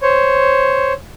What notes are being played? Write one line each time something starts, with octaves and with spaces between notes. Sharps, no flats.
C5 C#5